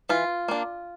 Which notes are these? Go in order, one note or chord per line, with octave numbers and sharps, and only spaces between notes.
E3 F4
A#3 D4